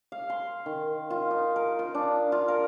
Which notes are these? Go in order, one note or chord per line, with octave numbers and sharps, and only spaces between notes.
F5
C6
D#3
F4
D#4
A#4
F4
D4
F4
A#4